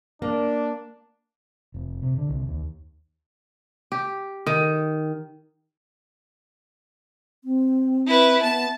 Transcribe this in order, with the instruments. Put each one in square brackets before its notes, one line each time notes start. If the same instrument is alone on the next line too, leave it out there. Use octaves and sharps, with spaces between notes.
[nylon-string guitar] A#3 [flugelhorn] D4
[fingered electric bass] F1
C3
D3
C2
D#2
[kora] G4
D#3
[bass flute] C4
[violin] E4 B4
[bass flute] B3 [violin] A5